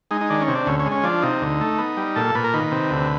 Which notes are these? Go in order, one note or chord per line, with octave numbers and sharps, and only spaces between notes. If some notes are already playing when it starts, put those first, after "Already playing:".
G#3 D#4
D#4
D#3 D4
C#4
C3
D4
D2 C#4
C#4
G#3
C#4
F3 D4
C3 D#4
D2
A3
B3
G3
A#2 A4
A#2 B4
A#4
D#3 B4
C3
D2